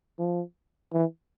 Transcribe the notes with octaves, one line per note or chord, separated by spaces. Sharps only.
F3
E3